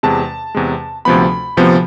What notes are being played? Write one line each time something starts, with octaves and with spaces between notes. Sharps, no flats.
E2 C3 G#3 A5
E2 C3 G#3
D2 C3 F3 B3 B5
D2 C3 F3 B3